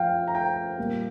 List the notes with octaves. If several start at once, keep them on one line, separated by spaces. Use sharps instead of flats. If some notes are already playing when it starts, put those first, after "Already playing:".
Already playing: F3 F5 G5
A#5
G5
A#2 G3 A#3